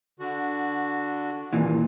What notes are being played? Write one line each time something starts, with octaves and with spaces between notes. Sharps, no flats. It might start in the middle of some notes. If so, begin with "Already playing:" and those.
D3 F#4
D#2 A#2 E3